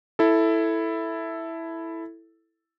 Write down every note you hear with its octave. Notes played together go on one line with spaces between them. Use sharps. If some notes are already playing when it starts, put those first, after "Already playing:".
E4 A4